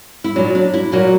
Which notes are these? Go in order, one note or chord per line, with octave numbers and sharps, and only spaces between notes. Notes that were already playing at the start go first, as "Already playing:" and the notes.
E4
A#2 F#3 D4
D4
E4
A#2 F#3 A#3